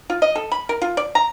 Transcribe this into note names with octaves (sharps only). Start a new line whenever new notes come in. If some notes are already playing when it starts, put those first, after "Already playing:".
F4
D#5
A4
B5
A#4
F4
D5
A#5